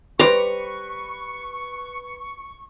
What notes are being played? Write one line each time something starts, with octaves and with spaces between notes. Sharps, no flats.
G3 B4 C5 D5 A#5 C#6